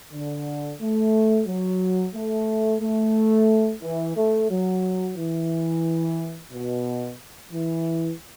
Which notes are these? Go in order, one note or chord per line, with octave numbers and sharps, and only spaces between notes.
D3
A3
F#3
A3
A3
E3
A3
F#3
E3
B2
E3